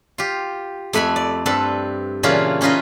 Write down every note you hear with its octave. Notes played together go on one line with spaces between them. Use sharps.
F4 G4
F2 A3 B4 G#5 B5
D5
G2 C4 A4 B4 A5
A#2 C#3 E3 C#4 D4 F4
E3 C#4 D#4 F4 B4 D#5